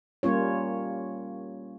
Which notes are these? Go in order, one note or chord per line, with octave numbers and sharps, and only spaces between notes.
G3 A#3 C#4 F4 C#5